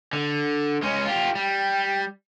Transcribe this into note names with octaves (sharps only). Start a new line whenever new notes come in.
D3
G#3 C#4
F4 G4
G3